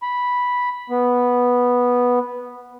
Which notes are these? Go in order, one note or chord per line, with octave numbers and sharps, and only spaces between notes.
B5
B3